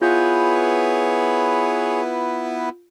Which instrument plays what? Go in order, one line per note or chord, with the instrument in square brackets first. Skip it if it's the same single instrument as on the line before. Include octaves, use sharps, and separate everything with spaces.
[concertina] B3 E4 B4 [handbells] F4 G6 [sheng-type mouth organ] G#4 C#5